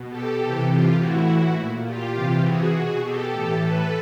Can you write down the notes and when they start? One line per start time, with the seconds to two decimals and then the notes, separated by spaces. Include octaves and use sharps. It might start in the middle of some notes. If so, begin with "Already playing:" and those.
Already playing: B2
0.09 G4 A4
0.40 C3 E3
0.68 F4 G4
0.97 A2 E3 E4 F#4
1.56 A#2
1.85 F4 G4
2.15 C3 E3
2.44 F#4 G#4
2.74 B2
3.02 G4 A4
3.31 A2 E3
3.61 A4 B4